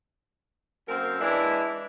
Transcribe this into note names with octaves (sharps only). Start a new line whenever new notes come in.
F#2 A#3 C4 A#4 C5
E3 G#3 D4 E4